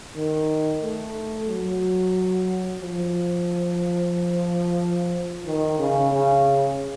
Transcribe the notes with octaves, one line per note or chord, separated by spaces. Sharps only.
D#3
A3
F#3
F3
D#3
C#3
C#3